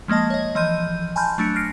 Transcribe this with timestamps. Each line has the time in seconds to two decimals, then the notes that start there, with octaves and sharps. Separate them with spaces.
0.08 F3 G#3 A#3 D#5 A5
0.30 C#5 D#5
0.55 E3 F3 D#5 C6 G6 D#7
1.16 G#5 A5 B5 C6 F6 G6
1.38 F#3 A3 D4 C#7
1.56 F6 A#6 C7 D7